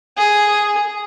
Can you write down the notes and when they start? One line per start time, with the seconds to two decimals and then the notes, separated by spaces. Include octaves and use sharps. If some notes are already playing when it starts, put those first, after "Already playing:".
0.17 G#4